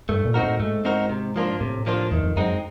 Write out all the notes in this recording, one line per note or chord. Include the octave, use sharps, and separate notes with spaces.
G2 A3
A#2
C4 D#4 F#4 A#4
A2
G#2 A3
C4 D#4 F#4 A#4
C3
F3 A#3 D4 F4
A2 C3
F3 A#3 D4 F4
E2 D#3
F2
F#2 G#3 C4 D#4